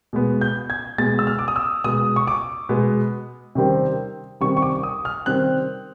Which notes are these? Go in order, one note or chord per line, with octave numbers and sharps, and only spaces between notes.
B2 G#3 B3
G6
G#6
B2 G#3 B3 A6
E6
F6
D6
D#6
E6
B2 G#3 B3 D#6
C#6
D6
B2 G#3 B3
C3 D#3 G3 C4
C3 D#3 G3 C4 C#6
C#6
D6
D#6
F6
C3 D#3 G3 C4 F#6